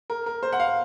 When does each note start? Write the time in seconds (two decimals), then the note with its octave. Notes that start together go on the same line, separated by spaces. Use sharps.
0.10 A#4
0.26 A#4
0.43 C5
0.53 F#5
0.60 F5